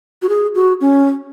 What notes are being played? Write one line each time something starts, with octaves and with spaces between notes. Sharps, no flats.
F#4
G#4
F#4
C#4